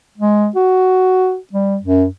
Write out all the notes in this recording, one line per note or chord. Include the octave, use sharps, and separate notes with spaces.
G#3
F#4
G3
F#2